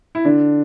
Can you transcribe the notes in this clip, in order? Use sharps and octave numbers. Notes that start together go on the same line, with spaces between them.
E4
D3 D4